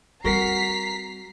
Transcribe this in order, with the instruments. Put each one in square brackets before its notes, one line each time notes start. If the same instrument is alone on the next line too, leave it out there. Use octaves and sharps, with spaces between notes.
[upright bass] G3 C4 [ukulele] F#4 A#4 F#5 [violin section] A#5 B6 C7